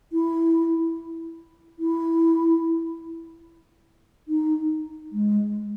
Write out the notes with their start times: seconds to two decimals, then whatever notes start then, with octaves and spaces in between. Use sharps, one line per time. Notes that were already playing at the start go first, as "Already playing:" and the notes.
0.13 E4
1.79 E4
4.28 D#4
5.12 G#3